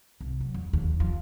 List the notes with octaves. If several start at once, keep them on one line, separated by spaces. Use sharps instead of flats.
C2
F#3
E2
D#2
F3